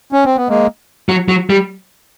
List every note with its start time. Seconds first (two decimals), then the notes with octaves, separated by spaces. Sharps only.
0.13 C#4
0.25 C4
0.37 B3
0.49 G#3 A#3
1.09 F#3
1.28 F#3
1.50 G3